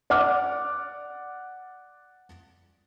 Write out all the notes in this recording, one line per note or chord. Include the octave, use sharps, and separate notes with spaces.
D5 F#5 D6 F6